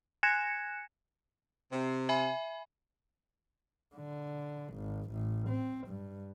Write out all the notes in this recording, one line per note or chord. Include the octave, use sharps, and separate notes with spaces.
G#5 F#6 G#6 A#6 C#7 E7
C3
E5 G#5 B5
D3
G#1
A1
C4
G2